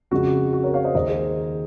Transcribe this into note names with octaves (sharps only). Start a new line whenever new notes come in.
F2 C#3 F3 G#3 F#4
F#4
A#4 C#5
C#5 F5
C5 D#5
D#2 D#3 G#3 C5 D#5
G#4 C5